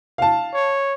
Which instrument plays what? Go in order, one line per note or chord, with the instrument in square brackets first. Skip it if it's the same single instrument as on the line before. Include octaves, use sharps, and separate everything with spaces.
[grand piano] F5 A5
[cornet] C#5